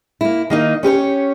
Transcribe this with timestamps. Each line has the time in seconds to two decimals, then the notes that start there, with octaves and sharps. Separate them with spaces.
0.21 A#3 E4
0.50 D#3 A#3 D#4
0.83 C#4 G4 B4 C#5